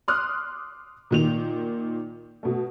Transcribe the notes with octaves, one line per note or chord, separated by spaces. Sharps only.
C6 D6 D#6 F6 F#6
A#2 D#3 F7
B2 A3